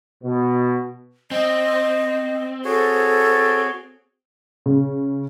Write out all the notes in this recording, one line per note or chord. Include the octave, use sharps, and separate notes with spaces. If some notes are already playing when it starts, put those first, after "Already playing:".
B2
C4 D#5
F#4 G#4 A4 C#5
C#3